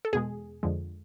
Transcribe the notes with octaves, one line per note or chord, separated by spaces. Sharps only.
A4
E2 B2 G#3 G#4
F2 D3 F3 G#3